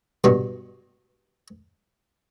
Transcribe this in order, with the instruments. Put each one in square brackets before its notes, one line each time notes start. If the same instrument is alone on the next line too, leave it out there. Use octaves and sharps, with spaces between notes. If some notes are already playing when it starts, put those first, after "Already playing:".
[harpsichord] G2 B2